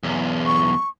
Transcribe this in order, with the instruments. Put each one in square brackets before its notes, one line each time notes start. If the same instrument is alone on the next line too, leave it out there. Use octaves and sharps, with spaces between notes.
[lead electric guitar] B1 E2
[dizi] C#6